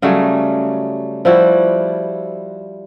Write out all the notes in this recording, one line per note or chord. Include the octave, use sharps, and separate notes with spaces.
C#3 F#3 G3 A3
F3 G3 E4 F#4